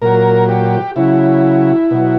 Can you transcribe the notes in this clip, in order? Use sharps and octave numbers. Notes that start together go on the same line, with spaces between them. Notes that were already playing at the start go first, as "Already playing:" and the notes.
A#2 F#3 A#4
G4
C#3 F#3 E4
B2 F#3